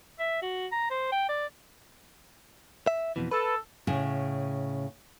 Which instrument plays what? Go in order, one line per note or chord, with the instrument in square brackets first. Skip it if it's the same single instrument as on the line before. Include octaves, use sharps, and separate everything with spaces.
[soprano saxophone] E5
F#4
A#5
C5
G5
D5
[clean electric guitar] E5
F2 B2 E3
[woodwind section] A4 [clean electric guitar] B4
[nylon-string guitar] A2 C#3